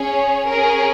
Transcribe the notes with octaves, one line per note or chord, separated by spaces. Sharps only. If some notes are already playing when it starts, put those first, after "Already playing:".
Already playing: C#4 G#4 C#5
C#4 G#4 A#4